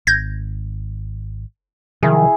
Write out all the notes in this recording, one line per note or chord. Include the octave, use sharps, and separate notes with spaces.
G#1 G6 G#6 A#6
C3 D#3 F3 F#3 E4 G#4